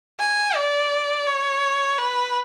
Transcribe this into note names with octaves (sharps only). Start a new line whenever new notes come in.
G#5
D5
C#5
B4